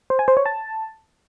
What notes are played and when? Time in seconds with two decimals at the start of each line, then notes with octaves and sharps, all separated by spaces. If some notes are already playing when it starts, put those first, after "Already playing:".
0.10 C5
0.19 G#5
0.28 C5
0.37 C#5
0.46 A5